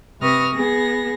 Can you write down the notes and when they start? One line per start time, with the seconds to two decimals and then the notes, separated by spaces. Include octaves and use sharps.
0.20 C3 B4 C#6 D#6 F6 A#6
0.54 B3 G#4 A#6